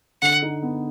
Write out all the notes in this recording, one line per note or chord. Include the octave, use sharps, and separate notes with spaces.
D3 F#5
D#4
B3